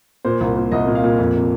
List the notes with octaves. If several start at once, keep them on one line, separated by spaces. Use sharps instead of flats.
A#2 C5
C2
A#2
C2 D#5
A#2
F5
A#2
F2
C3